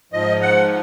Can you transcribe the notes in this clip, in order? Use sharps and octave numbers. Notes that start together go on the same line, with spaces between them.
G#2 F3 D#5
F#5